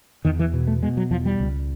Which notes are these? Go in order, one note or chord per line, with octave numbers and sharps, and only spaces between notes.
E2 D#3
E3
B2
A3
B2 G#3
F#3
E2 F3
G3
C#2